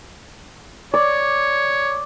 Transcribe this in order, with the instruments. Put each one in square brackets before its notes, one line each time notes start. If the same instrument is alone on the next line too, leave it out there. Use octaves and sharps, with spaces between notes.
[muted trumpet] C#5 [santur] D5